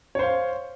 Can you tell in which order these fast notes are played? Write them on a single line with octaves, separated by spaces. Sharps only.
C#5 C5 F5